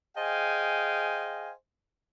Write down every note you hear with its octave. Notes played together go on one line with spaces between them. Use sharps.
G#4 C5 D#5 F5 G5 G#5